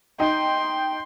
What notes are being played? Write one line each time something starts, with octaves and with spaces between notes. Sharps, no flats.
D#4 G5 C6